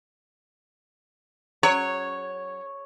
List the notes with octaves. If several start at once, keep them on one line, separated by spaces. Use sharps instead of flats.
F#3 C#5